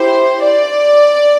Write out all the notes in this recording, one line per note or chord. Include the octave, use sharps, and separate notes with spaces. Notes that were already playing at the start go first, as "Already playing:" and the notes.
Already playing: E4 G4 C5
D5